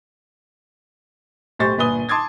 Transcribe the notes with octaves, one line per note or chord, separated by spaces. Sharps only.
B1 A2 G4 C5 C#6 A6
G1 A#2 B4 G#5 D#6 G7
A5 C6 D6 D#6 G#6 A6